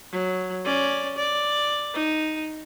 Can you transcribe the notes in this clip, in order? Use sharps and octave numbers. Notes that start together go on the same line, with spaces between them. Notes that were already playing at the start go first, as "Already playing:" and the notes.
F#3
C#4 D5
D5
D#4